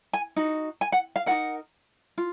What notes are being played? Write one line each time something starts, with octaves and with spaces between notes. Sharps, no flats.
G#5
D#4 F#4
G#5
F#5
F5
D#4 F#4 A#4 F#5
F4